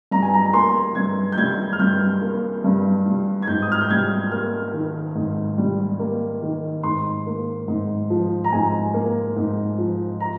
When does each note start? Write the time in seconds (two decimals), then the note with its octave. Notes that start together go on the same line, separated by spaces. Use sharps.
0.11 G2 A#5
0.22 G#5
0.34 A#5
0.45 A#5
0.53 A#3 C6
0.95 G2 G#6
1.32 G6
1.37 G3 G#6
1.73 F6
1.79 G2 G6
2.22 A#3
2.64 G2
3.06 G3
3.42 G#6
3.47 G#2 G6
3.62 D#6
3.72 F6
3.81 G6
3.90 G3 G#6
4.32 A#3 F6
4.73 D#3
5.15 G#2
5.58 G3
6.00 A#3
6.42 D#3
6.83 G#2 C6
7.27 A#3
7.68 G#2
8.10 F3
8.44 A#5
8.52 G#2 G#5
8.94 A#3
9.36 G#2
9.78 F3
10.20 A#5